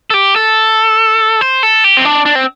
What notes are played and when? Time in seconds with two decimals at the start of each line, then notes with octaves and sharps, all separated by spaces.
0.10 A4
0.14 G4
0.36 A4
1.41 C5
1.63 A4
1.84 G4
1.97 C4
2.05 D4
2.26 D4
2.35 C4